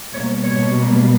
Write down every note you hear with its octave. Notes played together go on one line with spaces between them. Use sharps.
B2 G3 A#3 C#5
C#5